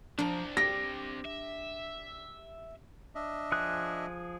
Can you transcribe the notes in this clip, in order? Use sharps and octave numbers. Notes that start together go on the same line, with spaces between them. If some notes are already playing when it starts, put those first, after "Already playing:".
F3 C4 D4 D5 A#5
G4 A#6
E5
D4 D#5 E5
F3 G#4 F#6